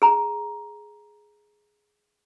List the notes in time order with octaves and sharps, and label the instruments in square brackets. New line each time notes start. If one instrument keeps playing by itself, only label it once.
[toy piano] G#4 A#5